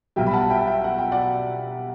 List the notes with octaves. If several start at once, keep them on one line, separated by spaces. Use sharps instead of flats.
B1 B2 G3 E5 G5
B5
F#5 A5
E5 G5
A5
E5 G5
F#5
G5
D5 F#5